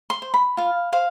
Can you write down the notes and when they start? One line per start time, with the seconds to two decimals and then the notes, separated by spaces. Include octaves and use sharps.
0.10 C6
0.22 C5
0.34 B5
0.57 F4 F5
0.92 C5 F5